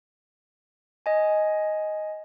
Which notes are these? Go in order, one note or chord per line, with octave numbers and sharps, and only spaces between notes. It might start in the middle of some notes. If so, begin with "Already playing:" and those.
D#5 G#5